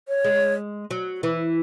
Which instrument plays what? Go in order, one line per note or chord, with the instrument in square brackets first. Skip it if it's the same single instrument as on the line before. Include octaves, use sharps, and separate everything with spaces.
[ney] C#5
[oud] G#3
F#3
E3